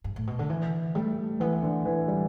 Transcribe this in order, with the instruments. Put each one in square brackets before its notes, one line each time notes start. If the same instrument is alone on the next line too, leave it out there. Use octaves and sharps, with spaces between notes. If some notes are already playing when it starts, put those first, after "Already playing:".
[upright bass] G2
A2
B2
D3
E3
[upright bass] G3 [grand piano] A3
[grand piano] E3 [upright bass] B3
[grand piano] D3
E3
G3